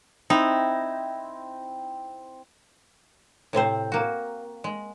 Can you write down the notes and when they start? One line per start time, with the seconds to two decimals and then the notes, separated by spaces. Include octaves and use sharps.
0.30 C4 D#4 E4
3.53 A2 C3 C4 C5
3.92 A#3 F#4
4.64 G#3